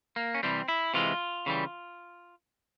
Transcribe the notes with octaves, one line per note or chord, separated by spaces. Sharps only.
A#3
C#4
C3 E3 G3 C4
E4
C3 E3 G#3 F4
C#3 E3 G3